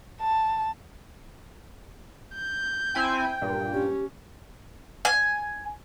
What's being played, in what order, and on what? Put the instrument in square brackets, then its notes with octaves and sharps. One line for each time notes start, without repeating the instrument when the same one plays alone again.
[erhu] A5
[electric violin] G6
[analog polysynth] C4 E4 G#5 [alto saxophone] G5
[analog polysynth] G2 A#2
[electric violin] C#4 [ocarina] G4
[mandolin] G#5